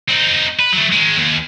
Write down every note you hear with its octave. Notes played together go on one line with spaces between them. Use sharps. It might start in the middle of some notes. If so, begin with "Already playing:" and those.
C4 D#4
B4
F#3 A3
D#3 G#3
D#2